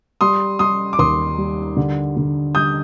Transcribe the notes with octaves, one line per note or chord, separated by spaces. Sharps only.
G3 C6 D#6
G3 C6 D#6
D6
D#2 C6 D#6
G3
D3
D3
G3 D#6 G6